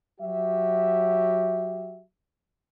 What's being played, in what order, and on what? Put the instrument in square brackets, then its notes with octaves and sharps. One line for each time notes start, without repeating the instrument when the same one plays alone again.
[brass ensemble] F#3 F#4 G4 E5